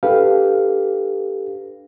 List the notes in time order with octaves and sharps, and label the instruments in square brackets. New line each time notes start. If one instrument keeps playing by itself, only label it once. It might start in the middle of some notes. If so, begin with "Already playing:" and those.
[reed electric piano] D4 G4 A4 B4 F5